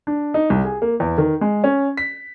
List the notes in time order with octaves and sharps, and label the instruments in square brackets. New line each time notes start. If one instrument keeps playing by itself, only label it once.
[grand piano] D4
D#4
C2
G#4
A#3
E2
D#3
G#3
C#4
B6